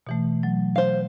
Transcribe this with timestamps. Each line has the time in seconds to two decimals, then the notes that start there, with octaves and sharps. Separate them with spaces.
0.07 B2 E3 A3
0.43 F#3
0.76 C5 F5